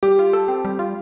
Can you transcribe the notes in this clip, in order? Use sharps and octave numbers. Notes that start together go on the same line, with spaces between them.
G3 G4
F4
A4
C4
G3
F4